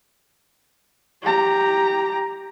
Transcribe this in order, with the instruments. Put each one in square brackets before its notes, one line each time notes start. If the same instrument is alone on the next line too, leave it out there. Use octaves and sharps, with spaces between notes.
[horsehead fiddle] G4 A#5